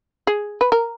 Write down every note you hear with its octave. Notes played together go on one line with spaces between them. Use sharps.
G#4
B4
A#4